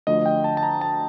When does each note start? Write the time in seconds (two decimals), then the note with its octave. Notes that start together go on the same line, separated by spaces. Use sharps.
0.07 D2 D3 F3 D#5
0.26 G5
0.44 A5
0.57 A5
0.63 A#5
0.81 A5